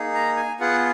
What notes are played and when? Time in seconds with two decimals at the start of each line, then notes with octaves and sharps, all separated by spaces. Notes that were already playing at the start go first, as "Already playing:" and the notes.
Already playing: A#3 D#4 G#4
0.14 A#5
0.37 G#5
0.60 B3 F4 G#4 F#5